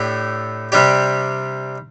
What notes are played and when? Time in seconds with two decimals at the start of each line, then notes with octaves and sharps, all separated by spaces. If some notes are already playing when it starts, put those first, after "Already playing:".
Already playing: A2 A3 D4 G4
0.72 C3 G3 D4 G4